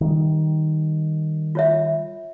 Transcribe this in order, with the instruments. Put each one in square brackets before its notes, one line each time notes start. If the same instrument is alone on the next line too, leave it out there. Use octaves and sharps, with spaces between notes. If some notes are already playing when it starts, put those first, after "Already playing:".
[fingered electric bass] D#3 G3
[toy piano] F4 C#5 E5